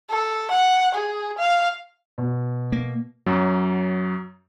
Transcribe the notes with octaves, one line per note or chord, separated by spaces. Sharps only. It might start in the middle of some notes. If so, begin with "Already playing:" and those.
A4
F#5
G#4
F5
B2
A#3
F#2 F#3